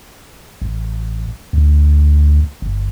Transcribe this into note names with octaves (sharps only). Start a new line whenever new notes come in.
A1
D2
G1